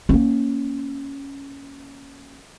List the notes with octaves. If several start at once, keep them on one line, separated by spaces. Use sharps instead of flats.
A#3 C#4